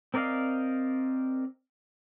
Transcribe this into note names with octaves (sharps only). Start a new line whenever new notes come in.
C4 A#4 D5 D#5 F5